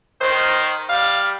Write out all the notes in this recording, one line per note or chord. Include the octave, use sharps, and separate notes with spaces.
D#3 C5
G3 F5